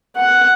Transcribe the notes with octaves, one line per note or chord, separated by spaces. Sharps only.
F#5